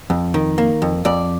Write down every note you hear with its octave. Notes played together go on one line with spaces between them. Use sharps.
F2
D#3
A#3
F2
F2 D5